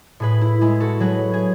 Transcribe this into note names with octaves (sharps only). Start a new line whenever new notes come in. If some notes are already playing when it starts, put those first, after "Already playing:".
A2 G#4 B4
E4
G#3 E4 G#4
F#4 A4
F#3 G#4 B4
G#4